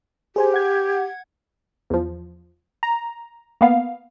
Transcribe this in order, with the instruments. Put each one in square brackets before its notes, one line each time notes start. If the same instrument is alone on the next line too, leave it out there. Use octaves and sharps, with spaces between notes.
[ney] G4 [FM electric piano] G#4 C5 G#5
[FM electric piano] F#5 G#6
[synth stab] E2 F3
A#5
A#3 B3 F5